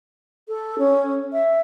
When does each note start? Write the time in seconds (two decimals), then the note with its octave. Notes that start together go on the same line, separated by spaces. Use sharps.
0.48 A4
0.79 C#4
1.33 E5